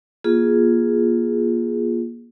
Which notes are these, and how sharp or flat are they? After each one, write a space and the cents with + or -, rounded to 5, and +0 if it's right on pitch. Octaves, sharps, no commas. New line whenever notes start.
A#3 +35 F4 +0 G#4 +0